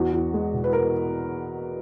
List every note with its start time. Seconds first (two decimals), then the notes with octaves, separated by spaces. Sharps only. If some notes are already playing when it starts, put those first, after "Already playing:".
Already playing: E2 F#4
0.13 E2
0.34 G#3
0.54 B2
0.64 B4
0.73 A#4